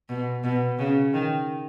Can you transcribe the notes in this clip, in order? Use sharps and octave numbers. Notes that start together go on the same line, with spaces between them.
B2
B2
C#3
D#3